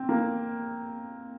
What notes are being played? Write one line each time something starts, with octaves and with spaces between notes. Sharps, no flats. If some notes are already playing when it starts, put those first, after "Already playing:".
Already playing: C4
A#3